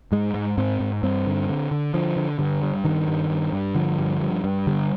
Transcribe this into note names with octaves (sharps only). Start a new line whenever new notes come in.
G#2 G#3
G#2
G#2 C4
G#2
G2 C4
D3
D3
D3
D3 F3
D3
G2 D3
G2
G2 D#3
G2
G2
G2
D3 F3
G2
G2
G2
D3 G3